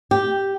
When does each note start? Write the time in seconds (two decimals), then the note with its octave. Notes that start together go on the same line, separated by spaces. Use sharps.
0.11 G4